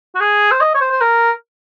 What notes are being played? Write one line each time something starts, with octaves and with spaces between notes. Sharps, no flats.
F#4
G#4
C5
D#5
C#5
C5
C5
A#4